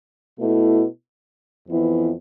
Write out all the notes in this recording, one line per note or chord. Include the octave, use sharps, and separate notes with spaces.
B2 A3 E4
F2 E3 B3 E4